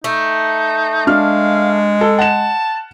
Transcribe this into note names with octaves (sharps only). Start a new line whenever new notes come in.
A3 D#4
G#3 D4 F5 F6
A4
F#5 A5 E7